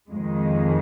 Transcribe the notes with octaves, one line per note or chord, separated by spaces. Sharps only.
F2 D#3 G#3